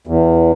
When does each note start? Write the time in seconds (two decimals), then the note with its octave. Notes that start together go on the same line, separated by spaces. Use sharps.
0.07 E2